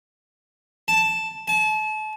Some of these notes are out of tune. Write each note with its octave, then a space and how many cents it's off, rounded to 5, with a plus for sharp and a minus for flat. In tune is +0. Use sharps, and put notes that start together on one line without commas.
A5 +0
A5 -35